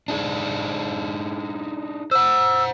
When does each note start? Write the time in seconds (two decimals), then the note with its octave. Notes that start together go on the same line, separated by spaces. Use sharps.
0.08 D4 D#4 G#4
2.11 C5 F#5 E6